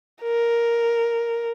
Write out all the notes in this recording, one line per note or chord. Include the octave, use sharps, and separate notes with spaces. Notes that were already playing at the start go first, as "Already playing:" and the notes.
A#4